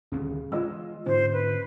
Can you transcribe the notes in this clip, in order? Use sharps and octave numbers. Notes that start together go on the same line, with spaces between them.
D#1 D2 C#3
E3 G#3 F4 D#5 E6
G#2 D3 C#4 C5
B4